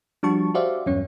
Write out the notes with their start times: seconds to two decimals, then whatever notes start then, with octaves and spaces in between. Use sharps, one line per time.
0.23 F3 G3 D4 F#4 A5 C#6
0.54 F#4 G4 C5 D5 E5 F5
0.86 E2 G2 F#3 C#4 C#5